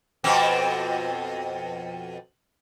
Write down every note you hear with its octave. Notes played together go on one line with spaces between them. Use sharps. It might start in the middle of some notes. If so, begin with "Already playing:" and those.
F2 B2 C4